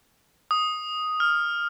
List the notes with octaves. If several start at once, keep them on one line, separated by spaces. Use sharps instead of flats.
D#6
F6